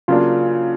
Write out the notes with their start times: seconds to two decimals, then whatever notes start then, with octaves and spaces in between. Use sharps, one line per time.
0.08 C#3 F#3 A#3 D4 F4